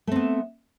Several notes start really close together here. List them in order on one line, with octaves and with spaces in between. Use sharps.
A3 C4 B3